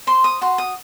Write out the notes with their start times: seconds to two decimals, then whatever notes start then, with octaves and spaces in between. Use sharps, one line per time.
0.07 C5 C6
0.24 D#6
0.41 F#4 C6
0.58 D#6